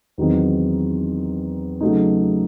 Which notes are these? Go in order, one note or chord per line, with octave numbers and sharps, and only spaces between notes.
E2 D#3 F#3 C4 D#4
C#3 F#3 A3 D#4